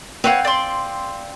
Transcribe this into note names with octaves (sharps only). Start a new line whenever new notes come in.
C4 B4 C#5 F5 F#5
D5 C6